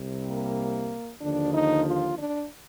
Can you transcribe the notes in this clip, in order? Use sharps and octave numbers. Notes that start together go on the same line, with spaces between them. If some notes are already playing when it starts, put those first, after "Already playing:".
Already playing: C2 C3 G3
A#3
D#2 D3 F3 D4
D#4
F4
D4